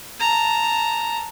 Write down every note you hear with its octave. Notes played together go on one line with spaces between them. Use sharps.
A5 A#5